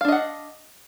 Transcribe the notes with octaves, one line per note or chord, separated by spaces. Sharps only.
D4 D#5 F5 F#5